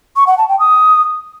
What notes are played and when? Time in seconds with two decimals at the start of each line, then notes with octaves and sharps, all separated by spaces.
0.16 C#6
0.27 F#5
0.38 A5
0.49 G5
0.59 D#6